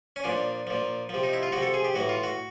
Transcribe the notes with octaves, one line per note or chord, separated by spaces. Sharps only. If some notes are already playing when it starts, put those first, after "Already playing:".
C#4
A#2 F3 D4
A#2 F3
C3 F3
D#4
E4
F4
C3 F3 F#4
A4
G#4
G4
A2 E3 F#4
F4
F#4